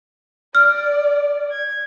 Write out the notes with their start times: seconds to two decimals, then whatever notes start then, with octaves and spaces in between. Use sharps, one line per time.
0.55 D5 F6
1.51 G#6